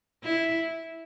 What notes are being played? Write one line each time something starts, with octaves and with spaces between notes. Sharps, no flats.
E4